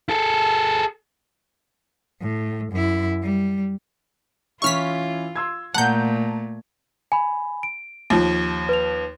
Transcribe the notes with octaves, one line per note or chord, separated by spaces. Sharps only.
G#4 A4
A2
F#2 E4
G3
E3 C#4 E4 F4 C#6 F6 B6
C6 E6 G#6
A#2 A3 F#5 A5 A#5 G6
G#5 B5
D7
D#2 F3
B4 F7